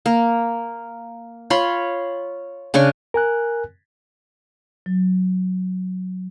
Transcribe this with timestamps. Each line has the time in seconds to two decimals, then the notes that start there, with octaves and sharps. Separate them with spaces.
0.06 A#3
1.50 F4 C#5 B5 C6
2.74 C#3 D4 G#5 C#6
3.14 A#4 G#5 F#6
4.86 F#3